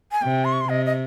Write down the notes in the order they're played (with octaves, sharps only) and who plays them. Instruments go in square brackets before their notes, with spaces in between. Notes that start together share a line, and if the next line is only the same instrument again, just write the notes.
[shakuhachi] G#5
[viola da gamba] C3 [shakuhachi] G5
[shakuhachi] C6
C#6
C6
[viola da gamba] C3 [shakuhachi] D#5
[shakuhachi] D#5